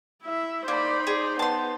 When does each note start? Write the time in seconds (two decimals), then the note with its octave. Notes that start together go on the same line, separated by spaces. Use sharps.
0.23 E4 E5
0.68 A#3 D#4 C5 D5 B5
1.07 G#4 D5
1.39 B3 A5 C6